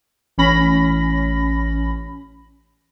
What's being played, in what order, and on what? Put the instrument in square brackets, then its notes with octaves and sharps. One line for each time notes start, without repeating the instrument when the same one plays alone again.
[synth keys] A1 C#4 B5 A#6